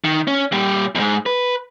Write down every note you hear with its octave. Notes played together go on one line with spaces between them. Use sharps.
D#3
C#4
A#2 G3
E2 G#2
B4